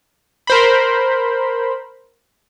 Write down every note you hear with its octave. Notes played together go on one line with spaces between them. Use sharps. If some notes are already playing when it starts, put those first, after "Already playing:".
A#4 C5 B5